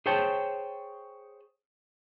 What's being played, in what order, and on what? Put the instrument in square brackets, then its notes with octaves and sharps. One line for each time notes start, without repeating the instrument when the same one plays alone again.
[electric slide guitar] G#4 C5 C#5 G5 A5